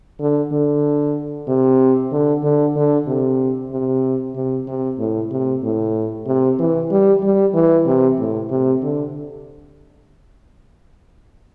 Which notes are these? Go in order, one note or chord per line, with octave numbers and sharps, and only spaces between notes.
D3
D3
C3
D3
D3
D3
C3
C3
C3
C3
A2
C3
A2
C3
E3
G3
G3
E3
C3
A2
C3
D3